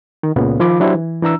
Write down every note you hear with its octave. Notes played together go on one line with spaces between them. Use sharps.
D#3
C#2 A#2 C#3 B3
D#3 F3 F4 B5 D6
F#3 D4 E4 G4 C5
E3
E3 D4 A#5 E6